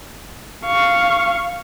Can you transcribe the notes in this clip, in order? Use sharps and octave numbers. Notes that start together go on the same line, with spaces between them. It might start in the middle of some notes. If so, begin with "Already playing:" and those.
F5 C#6